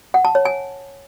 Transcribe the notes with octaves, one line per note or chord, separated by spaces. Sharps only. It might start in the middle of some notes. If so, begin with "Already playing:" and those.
F#5
A5
C#5
G#5